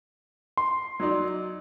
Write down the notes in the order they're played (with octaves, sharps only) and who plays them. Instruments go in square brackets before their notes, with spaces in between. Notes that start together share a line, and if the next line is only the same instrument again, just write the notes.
[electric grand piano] C6
[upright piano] F#3 D#4 D5